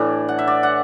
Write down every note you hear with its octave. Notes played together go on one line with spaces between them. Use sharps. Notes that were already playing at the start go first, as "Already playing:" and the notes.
Already playing: A2 E3 A3 D4 A4 B4
F#5
E5
D5
F#5